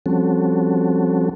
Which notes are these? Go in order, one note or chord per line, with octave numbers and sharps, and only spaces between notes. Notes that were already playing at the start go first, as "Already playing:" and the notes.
F3 G3 C4 C#4 F#4 A4